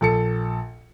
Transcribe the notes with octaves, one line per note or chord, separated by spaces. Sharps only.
A#1 A4 C#7